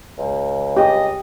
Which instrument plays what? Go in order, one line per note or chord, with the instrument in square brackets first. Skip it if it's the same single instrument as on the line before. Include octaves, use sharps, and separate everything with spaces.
[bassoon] C#2
[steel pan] G4 [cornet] D#5